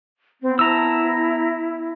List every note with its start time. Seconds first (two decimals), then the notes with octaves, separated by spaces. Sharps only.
0.42 B3 C4
0.59 E4 A5 A#5 E6